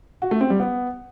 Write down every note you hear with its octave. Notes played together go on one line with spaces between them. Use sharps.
F#4
A3
C4
G3
B3